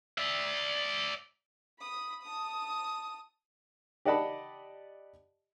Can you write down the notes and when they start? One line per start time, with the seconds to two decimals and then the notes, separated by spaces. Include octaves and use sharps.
0.18 D5 E5
1.79 B5 D#6
2.23 A5 D#6
4.05 G4 D5 D#5 F#5 A5 B5